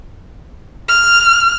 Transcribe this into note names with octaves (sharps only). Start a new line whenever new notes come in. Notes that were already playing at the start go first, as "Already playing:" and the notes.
F6